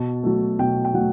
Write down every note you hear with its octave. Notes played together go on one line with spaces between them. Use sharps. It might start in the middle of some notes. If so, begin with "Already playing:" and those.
Already playing: B2 A5
F#3 A3
B2 G5
G5
F#3 A3 F#5